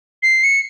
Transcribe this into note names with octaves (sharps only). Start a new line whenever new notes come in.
C7
C#7